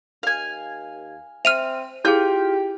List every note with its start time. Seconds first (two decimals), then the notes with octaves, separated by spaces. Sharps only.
0.23 D#2 F5 G#5
1.45 C4 E5 F6 D#7 F7
2.05 E4 F4 G4 G#4 G6